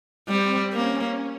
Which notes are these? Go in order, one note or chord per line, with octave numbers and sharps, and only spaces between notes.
G3 C4
A#3 C#4